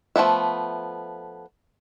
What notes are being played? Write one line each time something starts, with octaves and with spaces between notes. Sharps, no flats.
F3 A3 B3 E5